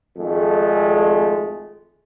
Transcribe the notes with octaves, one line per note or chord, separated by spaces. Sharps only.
G#1 F2 G#3 A3